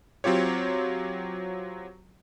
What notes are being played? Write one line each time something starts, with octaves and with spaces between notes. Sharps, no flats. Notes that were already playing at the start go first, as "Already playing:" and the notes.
F#3 C4 F4 G4 C#5